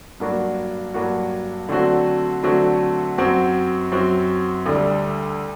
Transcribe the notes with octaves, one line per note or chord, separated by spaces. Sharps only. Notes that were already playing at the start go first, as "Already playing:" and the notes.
G2 F#3 A#3 D4 F#4
G2 F#3 A#3 D4 F#4
D3 F#3 A3 C4 F#4
D3 F#3 A3 C4 F#4
F#2 F#3 C4 F#4
F#2 F#3 C4 F#4
D2 D3 G3